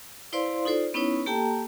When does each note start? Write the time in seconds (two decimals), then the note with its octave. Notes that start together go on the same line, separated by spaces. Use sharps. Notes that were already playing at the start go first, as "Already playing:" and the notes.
0.33 E4 B4 C5 D5 F5 C6
0.65 D#4 F4 A4 C5 D5
0.94 B3 C#4 D#4 E4 B4 C#5
1.26 A#3 G4 A4 G5 A5 A#5